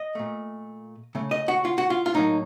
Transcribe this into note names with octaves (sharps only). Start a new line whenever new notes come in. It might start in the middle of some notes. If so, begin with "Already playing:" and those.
Already playing: D#5
A#2 A3
C#3 A3
D#5
F#4
F4
F#4
F4
F4
A2 F#3 A#3 D#4